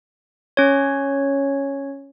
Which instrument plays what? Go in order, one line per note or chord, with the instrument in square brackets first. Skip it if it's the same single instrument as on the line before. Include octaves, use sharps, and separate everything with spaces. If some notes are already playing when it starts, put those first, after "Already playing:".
[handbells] C#4 C#5